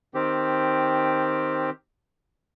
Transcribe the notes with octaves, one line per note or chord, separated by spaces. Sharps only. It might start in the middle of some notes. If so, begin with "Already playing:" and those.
D#3 C4 G4